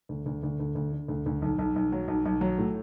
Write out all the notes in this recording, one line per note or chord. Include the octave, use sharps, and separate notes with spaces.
D2
D2
D2
D2
D2
D3
D2
D2
B1
B1
B1
F#3
B1
B1
F#3
A2